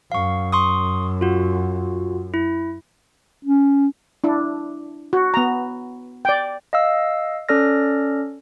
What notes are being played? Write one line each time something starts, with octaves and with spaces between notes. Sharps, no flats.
F#2 F5 C#6
C6 C#6 D#6
F4 F#4
E4
C#4
D4 E4
F#4
B3 A#5
D5 G5
D#5 F5 E6
C#4 A4 D5 F6 A#6